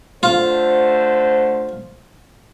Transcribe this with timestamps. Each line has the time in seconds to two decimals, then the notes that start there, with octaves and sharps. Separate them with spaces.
0.23 D3 A3 F4 C5